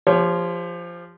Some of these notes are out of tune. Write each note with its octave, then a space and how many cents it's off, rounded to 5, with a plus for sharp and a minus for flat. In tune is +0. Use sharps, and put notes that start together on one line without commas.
F3 -10 G4 +35 C#5 +5